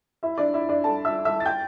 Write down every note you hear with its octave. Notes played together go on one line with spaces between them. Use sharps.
E4 E5
D4 D5
E4 E5
D4 D5
A4 A5
E5 E6
E5 E6
A6
G5 G6